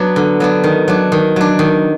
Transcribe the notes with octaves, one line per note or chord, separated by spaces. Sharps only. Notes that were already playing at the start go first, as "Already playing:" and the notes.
Already playing: F#3 B3 D4
D3
F#3 B3 D4
D#3
F#3 D4
D#3
F#3 D4
D#3